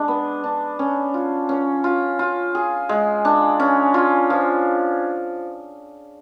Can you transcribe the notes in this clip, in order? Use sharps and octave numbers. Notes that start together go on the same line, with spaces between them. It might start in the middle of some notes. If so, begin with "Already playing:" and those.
Already playing: G#3 D4
B3
D4
C#4
F4
C#4
F4
F4
G#4
G#3
D4
C#4
F4
F3